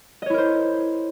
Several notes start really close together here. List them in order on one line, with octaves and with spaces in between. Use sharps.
D#5 C#5 E4 A#4 C5